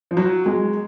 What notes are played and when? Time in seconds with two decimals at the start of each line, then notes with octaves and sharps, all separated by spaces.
0.11 F3
0.17 F#3
0.46 G#3